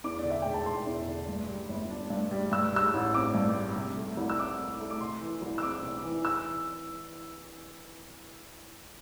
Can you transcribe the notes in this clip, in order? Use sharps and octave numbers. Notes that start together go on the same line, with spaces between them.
E2 D6
D5
D3
E5
E1 G5
A5
E1 C6
E2
D3
G2
G3
G1
D4
G2
G3
G2 E6
G3 E6
A1
C4 D6
G2
G3
C3
A3
C2
E6
C4 D6
C3
A3
D6
C3 C6
E3
C2
E6
C4 D6
C3
E3
E6